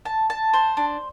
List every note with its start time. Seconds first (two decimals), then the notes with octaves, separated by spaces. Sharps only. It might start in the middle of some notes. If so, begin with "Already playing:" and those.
0.05 A5
0.30 A5
0.53 C5
0.77 D4